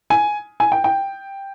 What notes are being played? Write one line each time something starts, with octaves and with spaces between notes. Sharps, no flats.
G#5
G#5
G5
G5